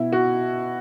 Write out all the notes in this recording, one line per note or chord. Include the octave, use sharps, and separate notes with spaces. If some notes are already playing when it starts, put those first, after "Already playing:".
Already playing: B2 E4
F#4